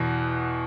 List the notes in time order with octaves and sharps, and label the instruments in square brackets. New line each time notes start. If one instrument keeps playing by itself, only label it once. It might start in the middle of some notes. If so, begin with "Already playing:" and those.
Already playing: [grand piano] E2 B2